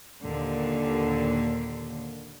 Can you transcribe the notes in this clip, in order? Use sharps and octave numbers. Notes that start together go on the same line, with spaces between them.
D#2 A#2 D3